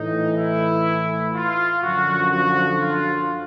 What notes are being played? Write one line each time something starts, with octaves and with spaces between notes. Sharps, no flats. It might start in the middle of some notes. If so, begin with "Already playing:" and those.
Already playing: A2 E3 D#4
E4
F4
F#2 D3 F3 F#4
F#4
F4